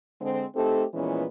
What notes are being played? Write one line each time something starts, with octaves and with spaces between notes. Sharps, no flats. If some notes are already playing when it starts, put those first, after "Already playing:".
D3 G#3 C4
A3 C4 D#4 G4 A4
A#2 E3 F3 G#3 B3 C#4